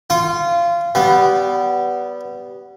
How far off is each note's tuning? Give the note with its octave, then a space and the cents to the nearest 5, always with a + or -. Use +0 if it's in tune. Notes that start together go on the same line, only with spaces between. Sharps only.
F4 -20 C6 +35
G3 -20 B3 +0